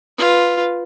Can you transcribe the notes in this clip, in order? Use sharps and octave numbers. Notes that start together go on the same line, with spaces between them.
F4 B4